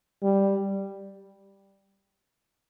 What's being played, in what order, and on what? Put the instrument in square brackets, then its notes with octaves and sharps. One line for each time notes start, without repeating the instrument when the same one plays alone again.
[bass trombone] G3